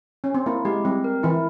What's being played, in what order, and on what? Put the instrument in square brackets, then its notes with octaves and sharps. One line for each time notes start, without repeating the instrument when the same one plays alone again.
[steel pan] C#4
C4
[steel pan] A#3 [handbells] E4
[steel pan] G#3 [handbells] G4
[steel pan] G3 [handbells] C4
[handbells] A#4
[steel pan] E3 [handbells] E4